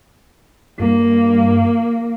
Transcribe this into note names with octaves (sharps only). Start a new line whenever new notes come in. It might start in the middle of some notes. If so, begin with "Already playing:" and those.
G2 A#3